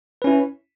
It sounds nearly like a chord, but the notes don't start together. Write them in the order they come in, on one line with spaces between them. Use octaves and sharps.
B4 C#4 E4